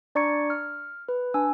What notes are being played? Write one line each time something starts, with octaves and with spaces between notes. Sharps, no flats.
D4 D5 A#5 C#6 G#6 C#7
F6
B4
D4 G#5 E6